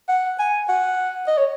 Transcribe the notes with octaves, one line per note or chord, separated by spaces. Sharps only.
F#5
G#5
F#5
D#5
C#5